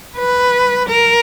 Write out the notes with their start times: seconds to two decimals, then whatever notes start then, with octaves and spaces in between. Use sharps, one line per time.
0.17 B4
0.89 A#4